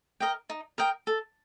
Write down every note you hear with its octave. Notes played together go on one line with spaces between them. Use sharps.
A#4 D#5 G5
D#4
A#4 D#5 G5
A4